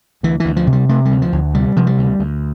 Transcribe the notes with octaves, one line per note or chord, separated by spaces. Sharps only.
D2 E3
D2 E3
F3
C3
G3
C3 A3
G3
D2
F3
D2
C3 G3
C3 F3
G3
D2
D2